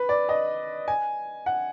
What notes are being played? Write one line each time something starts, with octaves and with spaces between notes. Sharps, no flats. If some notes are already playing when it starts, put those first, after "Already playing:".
Already playing: B4
D5
D#5
G#5
F#5